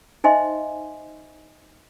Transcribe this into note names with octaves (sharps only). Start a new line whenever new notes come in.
D#4 C5 D#5 E5 G#5 C6